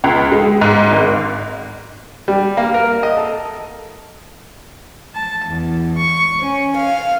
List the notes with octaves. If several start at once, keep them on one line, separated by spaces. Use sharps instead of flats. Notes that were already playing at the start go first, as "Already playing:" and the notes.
C#2
G#3
G#2
G#1
G3
A#3
A#4
D#5
A4
A5
E2
C#6
C#4
F5